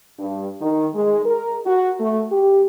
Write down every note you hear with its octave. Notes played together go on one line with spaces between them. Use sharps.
G2
D#3
G#3
A#4
F#4
A3
G4